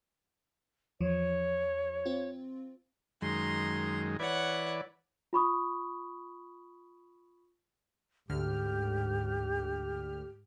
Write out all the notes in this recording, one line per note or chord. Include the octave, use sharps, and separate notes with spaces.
E2 F3 C#5
C4 F4
F#2 D#3 G#3 A#5 C6
E3 B4 C#5 D5 F#5
F4 B5 C#6 D#6
D2 G#2 D3 G4 F6